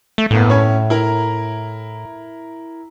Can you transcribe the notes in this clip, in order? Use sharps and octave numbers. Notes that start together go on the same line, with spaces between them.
A3
G1 A2 A#3 B3
C#4 C#5
E4 A#4 A#5